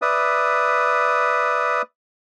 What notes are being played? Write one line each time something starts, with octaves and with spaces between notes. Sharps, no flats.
B4 D5 E5 D#6